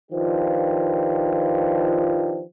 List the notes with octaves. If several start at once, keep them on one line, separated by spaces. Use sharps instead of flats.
D#3 F3 D4 F4 G4 B4